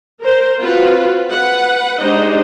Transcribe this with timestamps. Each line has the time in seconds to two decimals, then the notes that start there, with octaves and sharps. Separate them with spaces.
0.22 A#4 C5
0.59 C4 F4 F#4 B4
1.30 B4 F#5
2.00 G#3 D4 D#4 G4 C5 D#5